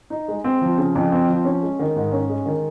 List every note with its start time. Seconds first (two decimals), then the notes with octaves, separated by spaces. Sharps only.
0.10 D#4
0.28 G#3
0.44 C4
0.61 F3
0.78 C#3
0.95 F2
1.12 C4
1.28 F3
1.45 C#4
1.63 G#3
1.79 D#3
1.96 G#2
2.12 C#4
2.29 G#3
2.46 D#3